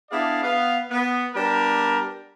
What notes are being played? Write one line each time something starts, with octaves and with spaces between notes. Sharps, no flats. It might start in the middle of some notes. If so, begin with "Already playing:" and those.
B3 D4 E4 G#4 D5 F5
B3 F5
B3
G3 B3 D4 G4 A#4